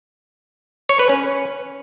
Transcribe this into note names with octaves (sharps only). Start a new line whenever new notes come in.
C#5
B4
C#4